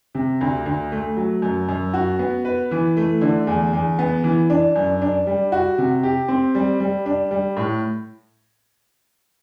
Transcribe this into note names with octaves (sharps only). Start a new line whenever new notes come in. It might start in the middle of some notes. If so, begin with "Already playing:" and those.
C3
D2
D2
A3
F#3
F#2
F#2
F#4
B3
B4
E3
A3
D3
E2
E2
B3
E3
D4
F#2
D4
G3
F#4
C3
G4
C4
G3
G3
D4
G3
A2